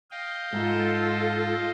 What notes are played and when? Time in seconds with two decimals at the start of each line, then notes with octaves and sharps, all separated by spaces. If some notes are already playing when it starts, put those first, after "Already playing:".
0.11 D#5 F5 G5
0.53 G#2 F4 A4